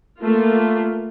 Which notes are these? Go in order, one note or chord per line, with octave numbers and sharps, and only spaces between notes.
A3 A#3 F4